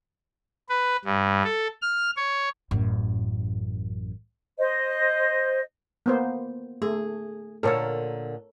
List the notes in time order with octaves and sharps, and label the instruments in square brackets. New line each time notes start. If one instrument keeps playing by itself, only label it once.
[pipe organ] B4
G2
A4
F6
C#5
[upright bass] A1 F#2
[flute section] C5 D#5
[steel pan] A#3 B3 C5
[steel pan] A3 [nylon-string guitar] G#4
[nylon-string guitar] A#2 D3 A#3 [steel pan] A4 A#4 C#5